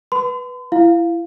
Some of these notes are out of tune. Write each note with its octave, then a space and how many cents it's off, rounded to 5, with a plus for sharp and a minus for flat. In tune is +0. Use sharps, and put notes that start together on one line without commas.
B4 -5 C6 -45
E4 +25 F5 +0